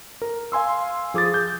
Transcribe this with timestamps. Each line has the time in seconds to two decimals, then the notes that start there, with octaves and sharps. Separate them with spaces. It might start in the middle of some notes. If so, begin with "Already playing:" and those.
0.22 A#4
0.52 F5 G#5 C6 E6
1.14 F3 G#4 D6 D#6 A6
1.34 G6